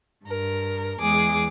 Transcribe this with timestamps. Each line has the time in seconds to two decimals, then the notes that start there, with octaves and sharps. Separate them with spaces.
0.25 G2 A#4
0.99 E2 G#3 G#4 D6